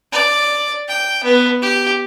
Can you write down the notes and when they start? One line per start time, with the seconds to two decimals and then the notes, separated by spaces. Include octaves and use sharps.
0.12 D5
0.88 G5
1.24 B3
1.62 G4